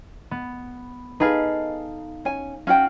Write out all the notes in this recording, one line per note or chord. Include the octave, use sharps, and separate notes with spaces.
B3
D#4 G#4 A4 B4 F5
C#4 G#5
C#4 F#4 F5 G5